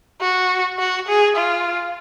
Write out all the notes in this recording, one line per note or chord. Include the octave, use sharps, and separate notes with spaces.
F#4
F#4
G#4
F4